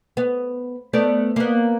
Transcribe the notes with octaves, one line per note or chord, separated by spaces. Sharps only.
B3
A3 B3 D5
A#3 B3